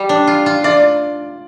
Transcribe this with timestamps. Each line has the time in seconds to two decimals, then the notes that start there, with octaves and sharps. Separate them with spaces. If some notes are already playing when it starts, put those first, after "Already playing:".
Already playing: G3
0.09 D4
0.27 F4
0.46 F4
0.64 F4 D5